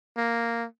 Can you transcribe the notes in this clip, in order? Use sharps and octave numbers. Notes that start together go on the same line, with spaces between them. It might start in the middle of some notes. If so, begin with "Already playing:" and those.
A#3